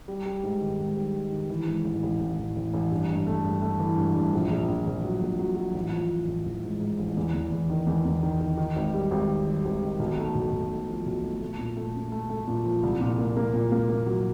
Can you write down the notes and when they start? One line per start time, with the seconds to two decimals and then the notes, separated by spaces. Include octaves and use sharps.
0.08 G3
0.26 G3
0.43 G#2
0.61 D#3
0.79 G#2
0.97 G3
1.14 G3
1.32 D#3
1.50 E3
1.67 G#2
1.84 A1
2.03 A1
2.20 A1
2.39 A1
2.56 A1
2.74 A1
2.91 G2
3.09 G2
3.27 A3
3.44 G2
3.62 A3
3.80 E3
3.97 G2
4.15 G2
4.33 A#1
4.51 A#1
4.69 A#2
4.87 A#1
5.04 F#3
5.21 A#1
5.39 F#3
5.56 F#3
5.74 A1
5.92 F3
6.10 A1
6.28 A1
6.45 A1
6.63 G#2
6.80 G#2
6.99 A1
7.17 E2
7.34 E2
7.52 E2
7.70 D#3
7.87 E2
8.05 E2
8.23 D#3
8.41 D#3
8.57 D#3
8.76 G#1
8.94 G3
9.11 G#1
9.28 D#3
9.47 G3
9.65 G#1
9.82 D#3
9.99 B1
10.17 A3
10.35 B1
10.52 B1
10.71 A3
10.89 F3
11.06 B1
11.23 A3
11.41 A3
11.59 A#2
11.77 A3
11.95 C#4
12.12 A3
12.30 A3
12.48 A#2
12.66 F3
12.83 C2
13.01 A#2
13.18 A#3
13.36 A#3
13.53 A#2
13.72 A#3
13.89 A#3
14.06 F#3